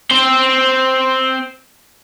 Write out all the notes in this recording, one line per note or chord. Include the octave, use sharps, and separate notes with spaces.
C4 C5